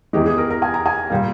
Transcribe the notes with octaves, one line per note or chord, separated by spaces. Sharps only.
E2 E3 G#3 G4
G#4
A#4
A#4
G#5
A#5
G#5
A#2 G3 A#3